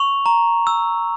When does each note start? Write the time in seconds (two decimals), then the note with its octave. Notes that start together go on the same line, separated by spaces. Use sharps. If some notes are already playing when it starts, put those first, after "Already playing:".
Already playing: C#6 F7
0.26 A#5
0.67 E6